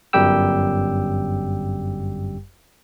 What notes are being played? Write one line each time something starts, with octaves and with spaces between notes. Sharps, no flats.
G1 F#2 G3 G4 G5 E6